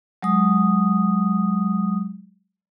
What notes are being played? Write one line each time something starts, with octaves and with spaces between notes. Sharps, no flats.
F#3 G#3 D#6